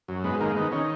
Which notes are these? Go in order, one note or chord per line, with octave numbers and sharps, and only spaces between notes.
F#2
G#2 B3
D#3 A#3
D#3 B3
D#3 C#4